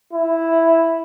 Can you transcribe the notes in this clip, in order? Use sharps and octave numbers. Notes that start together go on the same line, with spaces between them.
E4